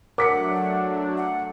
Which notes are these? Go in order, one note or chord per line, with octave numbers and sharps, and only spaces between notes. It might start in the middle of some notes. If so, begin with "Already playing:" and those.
F#3 A3 D4 A#4 F#5 D6 B6 C#7
F#5